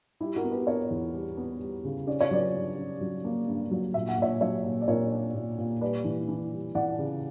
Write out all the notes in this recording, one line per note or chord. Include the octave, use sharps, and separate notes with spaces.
G3 E4 G4
F#4 A#4
B3
G4 B4
B3 A#4 C#5
E2
G3
B3
G3
C#3
C#4 D5
C#5
F#3 B4 D5
G2
C#4
F#3
A#3
G2
F#3
A#2 E5
F#5
A#2 C#5 E5
F#3 C#5 E5
A#2
D5
A#2 A#4 C#5
D4
A#2
A#2
G3 B4 D5
E3
E3
G3
E3 D5 F#5
C#3